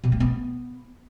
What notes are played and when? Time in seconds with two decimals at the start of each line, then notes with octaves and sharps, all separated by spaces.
0.04 B2
0.12 A3
0.20 B3